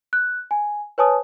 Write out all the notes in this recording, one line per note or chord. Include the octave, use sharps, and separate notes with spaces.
F#6
G#5
B4 C#5 G#5 A5 D#6